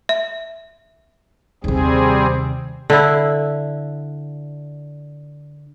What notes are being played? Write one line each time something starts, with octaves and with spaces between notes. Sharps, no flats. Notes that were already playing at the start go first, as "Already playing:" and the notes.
E5
D#2 C3 G3 C4 G#4
D3 E4